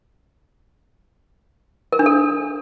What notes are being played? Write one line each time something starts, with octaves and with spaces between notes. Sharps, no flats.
A#4
D4
A4